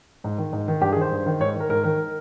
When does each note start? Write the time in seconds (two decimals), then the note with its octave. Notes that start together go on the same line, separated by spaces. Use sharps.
0.24 G#2
0.38 D#3
0.52 G#2
0.68 D#3
0.81 G2 G4
0.92 G#4
0.96 D#3 C5
1.12 G2
1.26 D#3
1.40 G#2 C#5
1.56 D#3 A#4
1.69 G#2 A#4
1.84 D#3 A#4